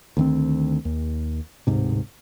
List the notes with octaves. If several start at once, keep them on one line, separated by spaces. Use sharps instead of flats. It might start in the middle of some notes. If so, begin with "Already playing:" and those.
D2 D#3 C4
D#2
D1 G#2 C3